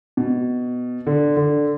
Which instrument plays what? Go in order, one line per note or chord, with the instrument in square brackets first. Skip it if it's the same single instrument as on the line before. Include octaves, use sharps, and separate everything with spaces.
[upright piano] B2
D3
D3